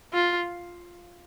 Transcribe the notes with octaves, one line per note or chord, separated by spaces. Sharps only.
F4